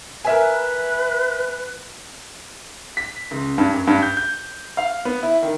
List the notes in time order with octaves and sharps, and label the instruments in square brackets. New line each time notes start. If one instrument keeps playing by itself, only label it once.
[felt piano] A#4 E5 G#5 [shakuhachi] B4
[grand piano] B6
C#2
G2
F#2
G2
G6
G6
F5
B3
E4
D#3